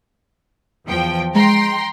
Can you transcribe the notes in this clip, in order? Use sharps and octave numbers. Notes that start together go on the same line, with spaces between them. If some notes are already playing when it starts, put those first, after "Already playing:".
E2 F3 G5
G#3 G5 A#5 C6